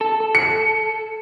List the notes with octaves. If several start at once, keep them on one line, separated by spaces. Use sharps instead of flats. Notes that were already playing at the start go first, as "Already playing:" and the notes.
A4
A4
C#7